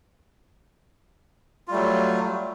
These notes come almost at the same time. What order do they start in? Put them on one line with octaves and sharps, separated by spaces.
F4 G3 A3 F#3